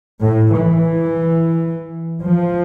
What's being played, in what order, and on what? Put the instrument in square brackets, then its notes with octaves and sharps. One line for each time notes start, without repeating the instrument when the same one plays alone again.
[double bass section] A2
E3
F3